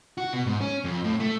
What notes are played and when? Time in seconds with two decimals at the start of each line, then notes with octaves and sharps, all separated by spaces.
0.18 F#4
0.33 B2
0.46 G#2
0.61 C#4
0.84 F2
1.04 A2
1.20 A3